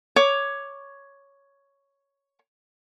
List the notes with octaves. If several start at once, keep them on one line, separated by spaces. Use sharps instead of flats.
C#5 D6